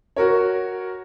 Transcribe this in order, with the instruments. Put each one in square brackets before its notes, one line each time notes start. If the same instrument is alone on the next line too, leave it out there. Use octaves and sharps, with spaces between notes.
[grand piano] F#4 A#4 C#5